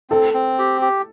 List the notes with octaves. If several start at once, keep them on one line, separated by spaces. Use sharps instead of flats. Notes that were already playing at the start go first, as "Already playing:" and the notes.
C4 A4
C4
G4
G4